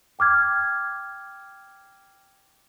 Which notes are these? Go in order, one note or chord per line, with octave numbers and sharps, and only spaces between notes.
G5 D6 F6 G#6